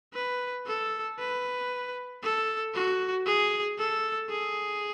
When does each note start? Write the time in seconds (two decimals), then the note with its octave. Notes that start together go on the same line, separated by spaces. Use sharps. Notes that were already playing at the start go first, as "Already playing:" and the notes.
0.14 B4
0.66 A4
1.19 B4
2.23 A4
2.74 F#4
3.26 G#4
3.78 A4
4.30 G#4